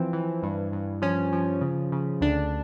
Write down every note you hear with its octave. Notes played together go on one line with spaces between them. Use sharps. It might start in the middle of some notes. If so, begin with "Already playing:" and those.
Already playing: E3 F3 C4
E3
G2
G2
F3 C#4
F3
C#3
C#3
D2 D4